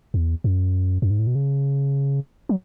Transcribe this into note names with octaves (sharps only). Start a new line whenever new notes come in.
E2
F#2
F#2
G#2
A2
B2
C#3
F#3